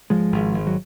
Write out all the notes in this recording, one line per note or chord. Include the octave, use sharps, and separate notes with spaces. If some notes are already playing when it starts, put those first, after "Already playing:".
G#1 F3 G#3
G#1
G#1
F#3